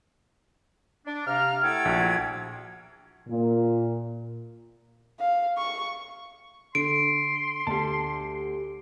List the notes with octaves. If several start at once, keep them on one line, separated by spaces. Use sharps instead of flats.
D4
C3 F5 A#5 F6
A3 E4 A4 F#5 G5 G#6
A#1 F#4
A#2
F5
C#6
D3 C6 D7
D2 G4 A5